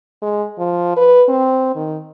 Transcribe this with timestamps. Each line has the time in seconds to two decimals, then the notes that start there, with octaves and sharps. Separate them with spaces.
0.22 G#3
0.58 F3
0.97 B4
1.28 C4
1.76 D#3